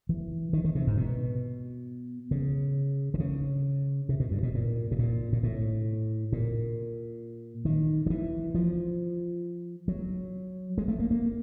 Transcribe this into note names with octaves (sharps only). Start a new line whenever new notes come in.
E3
D#3
D#3
C3
G#2
B2
C#3
D3
C#3
C3
B2
G2
B2
A#2
B2
A#2
A#2
A2
A#2
D#3
F3
E3
F3
F#3
G#3
A3
A#3
A#3